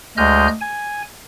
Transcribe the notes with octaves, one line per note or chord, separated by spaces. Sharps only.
D2 G#3 D#5 F6 G6
G#5